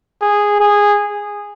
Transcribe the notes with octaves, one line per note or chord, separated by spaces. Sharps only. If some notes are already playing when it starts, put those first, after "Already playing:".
G#4
G#4